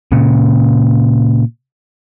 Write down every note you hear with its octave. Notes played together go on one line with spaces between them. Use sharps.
A#2 C#3